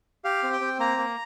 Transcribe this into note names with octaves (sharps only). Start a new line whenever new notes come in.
G4 F5
C4
G5
C4
A#3 A#5
A#3